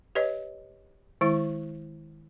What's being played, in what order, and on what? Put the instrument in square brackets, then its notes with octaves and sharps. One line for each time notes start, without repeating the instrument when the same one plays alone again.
[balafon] G4 B4 C#5 D#5
D#3 G#3 E4